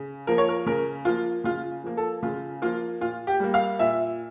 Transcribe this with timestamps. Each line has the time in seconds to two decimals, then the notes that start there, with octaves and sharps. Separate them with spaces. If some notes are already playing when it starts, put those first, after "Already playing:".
Already playing: C#3
0.27 F3 A#3 A#4
0.38 C#5
0.49 A#4
0.66 C#3 A#4
1.05 F3 A#3 F4
1.44 C#3 F4
1.84 F3 A#3
1.97 A4
2.23 C#3 F4
2.62 F3 A#3 F4
3.01 A#2 F4
3.27 G4
3.40 G3 A#3
3.54 F5
3.79 A#2 E5